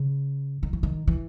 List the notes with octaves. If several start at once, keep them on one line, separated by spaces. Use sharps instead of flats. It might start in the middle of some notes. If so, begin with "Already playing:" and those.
Already playing: C#3
D#3
E3
D#3
E3